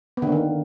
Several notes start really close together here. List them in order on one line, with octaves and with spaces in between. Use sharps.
B3 D3 A#3 D#3